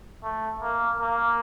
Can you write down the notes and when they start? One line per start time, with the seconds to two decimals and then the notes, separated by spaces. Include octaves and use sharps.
0.23 A3
0.62 A#3
1.00 A#3